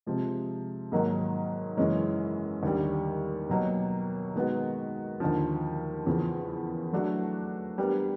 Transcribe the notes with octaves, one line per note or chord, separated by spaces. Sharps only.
C3 F3 G#3
G#2 D#3 F#3 A#3
F#2 C#3 E3 G#3 C#4
D#2 D3 G3
B2 F#3 A#3
D#3 G#3 B3 D#4 F#4
D#2 D3 F3
E2 C#3 F3
F#3 A3 D4 F#4
G3 B3 D4 G4 A#4